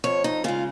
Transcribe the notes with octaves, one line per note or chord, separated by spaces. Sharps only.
F2 C#5
D#4
C#3 G#3 F4